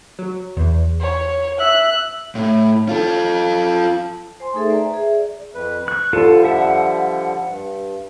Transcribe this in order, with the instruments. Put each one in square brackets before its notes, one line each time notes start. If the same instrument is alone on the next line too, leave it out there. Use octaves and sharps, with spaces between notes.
[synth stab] F#3
E2
[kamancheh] C#5
[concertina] E5 [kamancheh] F#6
[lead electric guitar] A2
F4 A4
[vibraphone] C5 G#5 C6
A3 D#4 G#4 A4 E5
B4 C5 D5 E5 G#5 A#5
G#4 E5
D5
[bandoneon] F2 B4
[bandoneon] C#6 [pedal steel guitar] F#6
[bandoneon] D3 F3 G3 [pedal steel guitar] F4 A4
[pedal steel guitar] E5 F#5
[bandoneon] G2